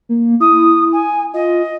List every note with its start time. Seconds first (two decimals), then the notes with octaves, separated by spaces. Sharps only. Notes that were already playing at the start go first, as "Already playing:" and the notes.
0.09 A#3
0.40 E4 D#6
0.92 G#5
1.34 F4 D#5